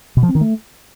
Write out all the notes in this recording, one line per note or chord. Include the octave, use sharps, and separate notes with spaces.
B2
F3
C4
D#3
A3